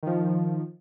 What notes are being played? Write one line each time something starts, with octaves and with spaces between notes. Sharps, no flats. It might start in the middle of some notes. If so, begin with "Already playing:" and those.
D#3 F3